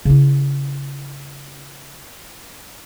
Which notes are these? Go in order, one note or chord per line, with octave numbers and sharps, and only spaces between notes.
C#3 E4